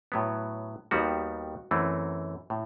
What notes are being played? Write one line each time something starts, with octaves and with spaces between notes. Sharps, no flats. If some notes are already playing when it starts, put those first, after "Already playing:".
A2 F#3 B3
D#2 D#3 G3 B3 F#4
F#2 E3 A3 C4
A2